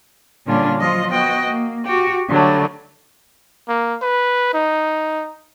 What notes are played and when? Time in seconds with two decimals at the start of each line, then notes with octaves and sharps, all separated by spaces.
0.45 A#2 D3 G3 C#4 D4 F4
0.78 F3 F#3 F4 D#5
1.10 B3 F#4 D#5 G5
1.48 A#3
1.83 F#4 G4
2.28 D3 F#3 G3 A3
3.69 A#3
4.02 B4
4.54 D#4